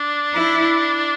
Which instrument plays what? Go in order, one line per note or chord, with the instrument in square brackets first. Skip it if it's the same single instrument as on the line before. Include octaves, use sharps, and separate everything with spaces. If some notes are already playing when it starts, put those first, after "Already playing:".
Already playing: [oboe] D4
[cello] E4